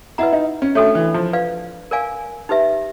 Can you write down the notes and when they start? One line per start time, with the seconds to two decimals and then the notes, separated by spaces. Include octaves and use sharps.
0.18 E4 B4 D#5 F#5 A#5
0.33 D#4
0.62 C#4
0.75 A3 D4 F#4 A4 C#5
0.95 E3
1.14 F3
1.33 B4 D5 F5
1.91 A#4 D5 F5 G#5
2.49 D#4 G4 B4 E5